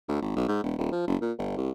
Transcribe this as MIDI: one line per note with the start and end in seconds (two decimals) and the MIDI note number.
0.08 0.17 38
0.22 0.36 32
0.36 0.43 35
0.48 0.59 44
0.63 0.74 28
0.78 0.88 27
0.92 1.05 53
1.07 1.16 30
1.21 1.32 46
1.38 1.54 31
1.56 1.70 36